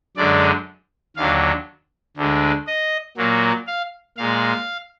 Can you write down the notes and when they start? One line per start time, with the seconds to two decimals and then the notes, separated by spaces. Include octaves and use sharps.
0.17 F#2 D3 G#3 D5
1.17 D#2 D3 F#3 F5
2.17 D2 D3 G#3
2.67 D#5
3.17 A#2 F#3 A#3
3.67 F5
4.17 A#2 G#3 F5